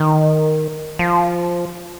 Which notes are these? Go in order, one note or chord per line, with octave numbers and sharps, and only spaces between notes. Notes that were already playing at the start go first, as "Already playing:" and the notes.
Already playing: D#3
F3